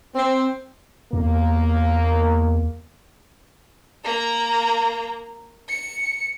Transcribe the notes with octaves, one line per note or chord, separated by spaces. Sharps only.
C4
E2 A#3
A#3 A#5
C#7